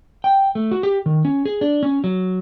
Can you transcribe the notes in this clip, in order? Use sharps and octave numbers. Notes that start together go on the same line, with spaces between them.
G5
A3
F#4
G4
D#3
C#4
G#4
D4
C#4
F#3